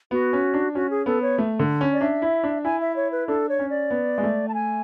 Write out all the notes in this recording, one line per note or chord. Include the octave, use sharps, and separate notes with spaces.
B3 F#4
C#4
D4
C#4 F#4
G#4
B3 A4
C#5
A3
D3
C#4
D5
D4 E5
E4
D4
E4 G#5
E5
C#5
B4
D4 A4
C#5
C#4
D5
B3
G#3
A3
A5
G#5